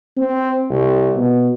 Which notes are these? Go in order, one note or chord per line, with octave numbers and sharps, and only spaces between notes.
C4
C2
B2